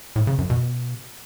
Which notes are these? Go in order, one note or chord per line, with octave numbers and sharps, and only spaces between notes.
A2
C#3
F#2
B2